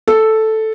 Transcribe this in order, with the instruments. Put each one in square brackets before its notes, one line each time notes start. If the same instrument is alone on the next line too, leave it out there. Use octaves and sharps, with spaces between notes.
[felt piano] A4